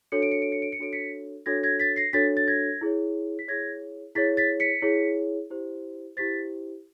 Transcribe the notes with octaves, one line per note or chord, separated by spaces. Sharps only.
D4 F#4 A4 C#5 C#7
D7
C#7
D7
C#7
D7
C#7
D4 F#4 A4 C#5 D7
B6 C#7
D4 F#4 A4 C#5 G#6 A#6
G#6 A#6
A6 B6
A#6 C7
D4 F#4 A4 C#5 A6 B6
A6
G#6 A#6
E4 G#4 C#5
B6
E4 G#4 C#5 G#6 A#6
E4 G#4 C#5 A6 B6
A6 B6
B6 C#7
E4 G#4 C#5
E4 G4 C5
E4 G4 C5 A6 B6